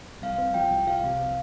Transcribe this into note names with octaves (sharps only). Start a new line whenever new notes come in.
C2 F5
C4
F3 G5
C2
F3 F5
C3
C3